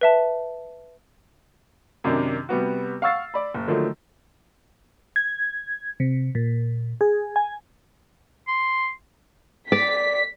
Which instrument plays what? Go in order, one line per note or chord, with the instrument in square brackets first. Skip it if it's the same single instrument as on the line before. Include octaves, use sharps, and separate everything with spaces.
[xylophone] B4 E5 A5
[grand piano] F#2 C3 D#3 D4
C3 G3 B3 F#4
F5 F#5 C#6 E6 A6 C7
D5 B5
F#1
D3 D#3 F3 F#3 A3
[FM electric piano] G#6
C3
A#2
G#4
G#5
[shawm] C6
[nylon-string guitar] D5 [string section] B6